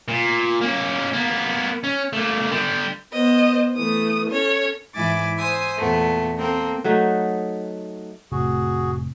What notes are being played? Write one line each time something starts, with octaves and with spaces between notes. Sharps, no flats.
A#2
A#3 C#4
A#3 B3
C#4
A3 A#3
D3 G3
B3 C5 D#5
E3 A3 D#6
C#4 A4 C#5
G#2 E3 E4 G#5 D6 A6
C5 E5 G#5 D#6
E2 A#2 A3 B3
A#3 C4 A4 A#4
F#3 A3 D#4 F#4
F1 A2 C3 F#4 G#4